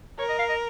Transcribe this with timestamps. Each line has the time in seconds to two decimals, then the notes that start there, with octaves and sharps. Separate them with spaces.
0.19 A#4 C#5
0.29 D#5
0.39 F5
0.49 D#5